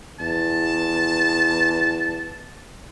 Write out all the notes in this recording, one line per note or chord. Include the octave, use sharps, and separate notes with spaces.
E2 A5